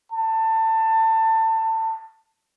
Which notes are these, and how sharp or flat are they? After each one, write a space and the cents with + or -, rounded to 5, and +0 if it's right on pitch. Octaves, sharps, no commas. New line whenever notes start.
A5 +25